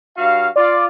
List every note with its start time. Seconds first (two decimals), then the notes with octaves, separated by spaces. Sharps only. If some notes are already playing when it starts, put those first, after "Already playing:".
0.17 G2 F#4 F5
0.56 F4 D5